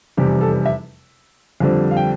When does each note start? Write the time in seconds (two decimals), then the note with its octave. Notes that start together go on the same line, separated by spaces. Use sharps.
0.17 F1 E2 C3 E3 G3 G4
0.41 A4
0.66 E5
1.60 F2 D3 G3 C4
1.91 F5
1.97 G5